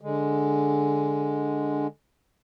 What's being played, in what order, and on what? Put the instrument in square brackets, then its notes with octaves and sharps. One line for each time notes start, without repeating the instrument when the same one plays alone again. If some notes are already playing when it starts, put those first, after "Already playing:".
[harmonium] D3 G#3